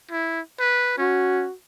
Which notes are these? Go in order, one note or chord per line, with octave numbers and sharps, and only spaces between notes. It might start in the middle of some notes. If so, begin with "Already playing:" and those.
E4
B4
C#4 F#4